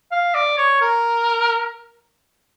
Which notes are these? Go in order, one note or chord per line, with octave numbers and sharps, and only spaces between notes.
F5
D5
C#5
A#4